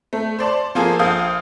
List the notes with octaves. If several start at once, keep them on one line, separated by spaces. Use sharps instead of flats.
A3
C5 D5 A5 C6
F3 A#3 F4 G#4 A4
A#1 F5 D#6 G6